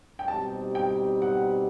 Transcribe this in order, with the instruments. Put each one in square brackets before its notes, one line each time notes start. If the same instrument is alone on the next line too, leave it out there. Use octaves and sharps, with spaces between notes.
[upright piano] G5
[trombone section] B2 G3 C4 D#4 G4 [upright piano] A5
[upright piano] G5
F#5